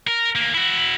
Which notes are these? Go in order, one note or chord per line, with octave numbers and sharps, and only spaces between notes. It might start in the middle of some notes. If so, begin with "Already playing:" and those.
A#4
D2 A#3
E4 F#4